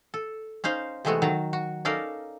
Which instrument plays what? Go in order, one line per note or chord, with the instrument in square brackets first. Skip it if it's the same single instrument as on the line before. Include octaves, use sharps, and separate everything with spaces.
[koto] A4
C#4 D#4 C5 F5
C3 E3 G#3 A3 B3 F#4
D#3 F#3 A5 A#5
F#4
C#4 D#4 A4 A#4 D5 F5